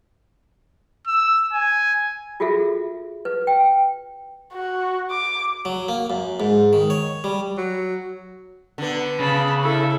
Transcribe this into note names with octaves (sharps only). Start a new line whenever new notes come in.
E6
G#5
F4 F#4 G#4 A4 E5
B4
G5
F#4
D6
F#3
A#3
F#2
G#2
D#3
C#5
G3
F#3
D3 B3
C#3 A5 B5
E4 A4